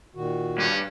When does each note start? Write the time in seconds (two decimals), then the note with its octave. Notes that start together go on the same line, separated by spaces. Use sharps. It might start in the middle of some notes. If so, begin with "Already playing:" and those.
0.15 A#2 D#3 F#4
0.58 G2 C#4